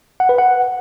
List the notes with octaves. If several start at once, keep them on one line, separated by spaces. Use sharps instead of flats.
F#5
B4
F#5